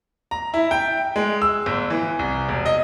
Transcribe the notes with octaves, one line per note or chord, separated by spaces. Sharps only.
A#5
E4
G5
G#3
E6
G1
E3
C2
E1
D#5